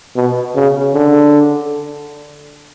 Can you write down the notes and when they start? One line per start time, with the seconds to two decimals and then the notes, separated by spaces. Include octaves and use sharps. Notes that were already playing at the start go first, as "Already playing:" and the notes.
0.16 B2
0.55 C#3
0.94 D3